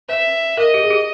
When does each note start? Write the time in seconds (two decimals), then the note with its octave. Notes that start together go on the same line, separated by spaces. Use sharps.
0.08 B4 E5
0.57 A#4 D#5
0.74 G4
0.84 G#4
0.90 G4